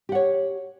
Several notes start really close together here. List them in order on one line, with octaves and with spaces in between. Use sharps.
G4 F#5 C#5